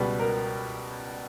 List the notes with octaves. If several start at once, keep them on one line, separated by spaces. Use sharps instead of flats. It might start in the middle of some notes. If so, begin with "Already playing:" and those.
Already playing: C#2 B2 G3 B4
A#4